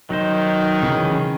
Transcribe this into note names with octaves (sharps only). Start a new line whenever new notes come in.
D#3 F#3 D#4 C5
C#3 E3 C#4